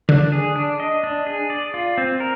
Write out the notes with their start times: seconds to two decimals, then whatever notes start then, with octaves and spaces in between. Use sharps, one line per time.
0.09 D3 D4
0.32 G#4
0.56 D4
0.80 D#5
1.04 D4
1.27 G#4
1.50 D5
1.74 F4
1.98 C4
2.20 A#4